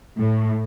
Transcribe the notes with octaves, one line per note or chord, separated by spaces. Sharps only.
A2